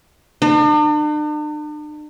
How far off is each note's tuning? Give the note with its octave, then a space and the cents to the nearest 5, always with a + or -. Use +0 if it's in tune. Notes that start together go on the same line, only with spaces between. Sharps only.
D4 +45